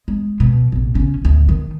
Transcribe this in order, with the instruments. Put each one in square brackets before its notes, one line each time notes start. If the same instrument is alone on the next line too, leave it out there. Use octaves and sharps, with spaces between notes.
[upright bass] G#3
B2
A#1 C3
C#3 C#4
A1 D2
D#3